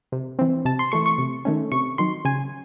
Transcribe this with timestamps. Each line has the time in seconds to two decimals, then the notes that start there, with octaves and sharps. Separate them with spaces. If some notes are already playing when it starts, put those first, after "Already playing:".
0.12 C3
0.39 E3 C4
0.65 C3 A5
0.79 C6
0.92 E3 A3 C#6
1.06 C#6
1.18 C3
1.45 D#3 A3 C#4
1.72 C3 C#6
1.98 D#3 F#3 C6
2.25 C#3 G#5